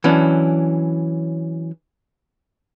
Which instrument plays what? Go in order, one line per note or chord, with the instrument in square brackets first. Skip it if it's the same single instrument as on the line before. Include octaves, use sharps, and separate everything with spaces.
[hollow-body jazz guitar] E3 F#3 C#4 D4